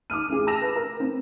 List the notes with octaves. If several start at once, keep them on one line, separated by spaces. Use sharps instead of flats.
D6 D#6 F6 D#7
A1 G#4
A5 D6 E6 A#6 E7 F7
B4
A#4
C4